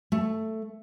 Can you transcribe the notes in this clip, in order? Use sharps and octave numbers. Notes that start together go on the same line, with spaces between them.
A3